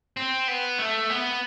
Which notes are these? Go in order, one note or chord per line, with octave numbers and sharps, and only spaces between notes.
C4
B3
A3
B3